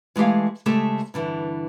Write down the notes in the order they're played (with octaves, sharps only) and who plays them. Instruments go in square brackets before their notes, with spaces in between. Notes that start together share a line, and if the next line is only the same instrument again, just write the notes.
[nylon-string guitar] E3 G#3 A3 G4 F5
C#3 G#3 A3 G4 A4
G2 D3 E3